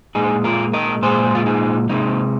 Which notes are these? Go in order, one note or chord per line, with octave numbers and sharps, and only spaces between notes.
A#2 G#3 D#4 G#4
F4 A#4
A#4 D#5
A#2 G#3 G#4 C5
F4
D#4 G#4
C3 G#3 A#3 D#4